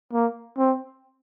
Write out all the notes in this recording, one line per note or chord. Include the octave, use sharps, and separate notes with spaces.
A#3
C4